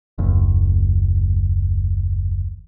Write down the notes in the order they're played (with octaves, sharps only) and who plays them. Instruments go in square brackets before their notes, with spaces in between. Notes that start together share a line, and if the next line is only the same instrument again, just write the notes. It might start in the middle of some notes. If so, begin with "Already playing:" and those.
[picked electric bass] F#1 D#2